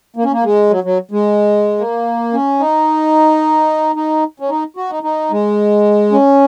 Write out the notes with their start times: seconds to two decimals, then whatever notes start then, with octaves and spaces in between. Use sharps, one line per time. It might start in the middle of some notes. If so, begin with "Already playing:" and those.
0.16 A#3
0.24 C#4
0.32 A#3
0.43 G#3
0.70 F#3
0.84 F#3
1.11 G#3
1.79 A#3
2.33 C#4
2.60 D#4
3.96 D#4
4.40 C#4
4.50 D#4
4.77 F#4
4.90 D#4
5.03 D#4
5.31 G#3
6.12 C#4